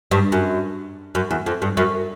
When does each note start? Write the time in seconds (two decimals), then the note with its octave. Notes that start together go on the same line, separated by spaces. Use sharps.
0.11 G2
0.32 F#2
1.15 F#2
1.31 E2
1.46 F2
1.62 G2
1.77 F#2